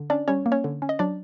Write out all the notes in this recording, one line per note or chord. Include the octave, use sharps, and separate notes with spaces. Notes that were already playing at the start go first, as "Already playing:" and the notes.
Already playing: D3
C#4 D4 D5
G3 C#4 C#5
A#3
C#4 C#5
D3
C#4
D#5
F#3 D4 D5